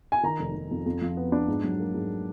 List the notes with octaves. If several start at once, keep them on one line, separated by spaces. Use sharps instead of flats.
G#5
D#3 A#5
F1
F1
F2
F2
F3
B3
D4
G#2
F#3
A#3
G#2